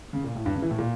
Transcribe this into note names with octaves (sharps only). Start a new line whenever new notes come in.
C#3
A#2
A2
G2
C#3
E3
A2
A#2